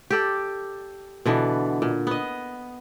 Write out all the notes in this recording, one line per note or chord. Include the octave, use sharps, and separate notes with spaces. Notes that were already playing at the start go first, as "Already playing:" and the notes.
G4 A4 D5
B2 D3 E3 B3
A#2
B3 D#5